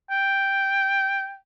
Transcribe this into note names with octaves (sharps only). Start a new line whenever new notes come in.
G5